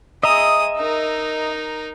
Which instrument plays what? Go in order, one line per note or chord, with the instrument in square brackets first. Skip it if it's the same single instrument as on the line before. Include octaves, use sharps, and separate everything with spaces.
[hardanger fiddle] G#3 D#6 [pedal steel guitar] D#5 E5 A#5
[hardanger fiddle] D#4 A#4